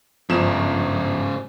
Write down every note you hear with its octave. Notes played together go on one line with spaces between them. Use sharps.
G1 G#2 C#3 F3 E7